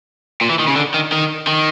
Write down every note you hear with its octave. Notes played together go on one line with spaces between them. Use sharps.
A#2
E3
D#3
C#3
D3
D#3
D#3
D#3